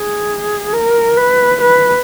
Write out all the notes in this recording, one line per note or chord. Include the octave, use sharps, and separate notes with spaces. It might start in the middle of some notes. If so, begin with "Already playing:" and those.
Already playing: G#4
A#4
B4
B4